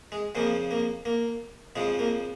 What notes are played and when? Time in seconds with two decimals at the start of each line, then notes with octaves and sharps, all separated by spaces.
0.12 G#3
0.35 F2 C#3 F3 A#3
0.71 A#3
1.05 A#3
1.76 F2 C#3 F3 G#3
1.99 A#3